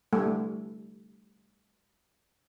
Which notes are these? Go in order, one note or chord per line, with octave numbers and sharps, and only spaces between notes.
G3 A3